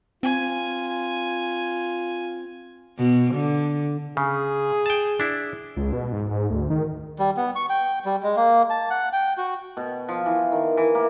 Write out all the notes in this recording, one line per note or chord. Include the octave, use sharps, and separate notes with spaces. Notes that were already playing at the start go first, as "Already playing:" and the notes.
C4 F4 G#5
B2
D3
C#3 G#4
G5 A5
D4 E4
C#2
B2
G#2
G#2
D2
D#3
G3
B3
C#6
G5
G3
G#3
A#3
A5
F#5
G5
F#4
B2
F3
E3
D#3
E3
A#3